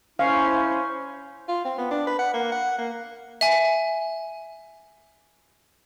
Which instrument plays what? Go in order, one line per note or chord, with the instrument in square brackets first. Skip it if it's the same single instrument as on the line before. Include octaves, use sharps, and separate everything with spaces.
[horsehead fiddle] C#4 [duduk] E4 [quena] C5 [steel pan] F5
[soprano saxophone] F4
C4
B3
D4
B4
F#5
A#3
F#5
A#3
[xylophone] E5 G#5